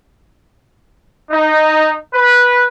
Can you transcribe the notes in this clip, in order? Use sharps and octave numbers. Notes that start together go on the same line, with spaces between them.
D#4
B4